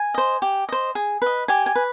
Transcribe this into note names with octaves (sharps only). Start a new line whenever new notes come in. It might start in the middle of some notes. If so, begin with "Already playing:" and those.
Already playing: G#5
C5 D#5
G4
C5 D#5
G#4
B4 D#5
G4 G#5
G#5
B4